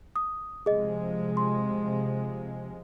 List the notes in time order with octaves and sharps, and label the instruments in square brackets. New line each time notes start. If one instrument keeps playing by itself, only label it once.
[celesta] D#6
[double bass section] C3 F3 G#3 [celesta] G#4 D#5
[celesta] C6